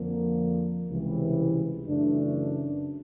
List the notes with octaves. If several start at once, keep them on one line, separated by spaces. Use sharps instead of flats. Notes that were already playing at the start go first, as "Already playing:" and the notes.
Already playing: F2 D3 F3 A#3
C#2 C3 E3 G3
F#2 C#3 E3 A3 D4